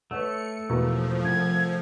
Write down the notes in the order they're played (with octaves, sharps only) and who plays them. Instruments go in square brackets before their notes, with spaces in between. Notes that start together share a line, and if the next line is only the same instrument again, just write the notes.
[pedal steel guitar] A3 [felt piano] B4 C#5 F#5 [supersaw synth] C#7
[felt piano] E2 B2 A#3 [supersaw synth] F3
[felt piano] C2 [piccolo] G#6